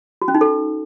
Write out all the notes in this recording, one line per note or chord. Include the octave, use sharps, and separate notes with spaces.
F#4
C#4
D#4
A4